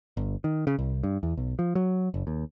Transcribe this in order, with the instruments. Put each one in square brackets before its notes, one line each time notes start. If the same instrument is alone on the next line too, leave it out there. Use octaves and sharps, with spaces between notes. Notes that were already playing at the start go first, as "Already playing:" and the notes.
[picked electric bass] G1
D#3
C#3
C2
G2
E2
B1
F3
F#3
F#1
D#2